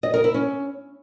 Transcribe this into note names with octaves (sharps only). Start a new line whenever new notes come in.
D#5
A#4
E4
C#4